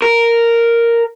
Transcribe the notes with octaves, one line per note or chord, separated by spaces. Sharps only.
A#4